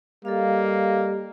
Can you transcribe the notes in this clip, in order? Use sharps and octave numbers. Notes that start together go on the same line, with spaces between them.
G3 A#3 A4 D#5 F5